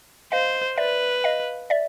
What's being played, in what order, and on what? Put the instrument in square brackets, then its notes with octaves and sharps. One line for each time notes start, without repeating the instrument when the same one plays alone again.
[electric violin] C5 [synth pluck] D#5 F5
[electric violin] B4 [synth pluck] D5 E5
[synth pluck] D#5 F5
D5 E5